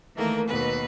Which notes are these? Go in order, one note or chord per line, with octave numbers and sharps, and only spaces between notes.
D#3 E3 A3 A#3 A#4
D#2 B2 B4